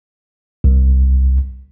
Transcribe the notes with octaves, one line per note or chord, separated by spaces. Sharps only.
C2